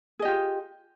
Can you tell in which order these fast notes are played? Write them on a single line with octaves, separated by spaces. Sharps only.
G#4 D#5 G4 F4